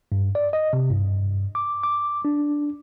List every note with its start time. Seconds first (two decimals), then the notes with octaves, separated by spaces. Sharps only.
0.12 G2
0.35 D5
0.53 D#5
0.73 C3
0.91 G2
1.55 D6
1.83 D6
2.25 D4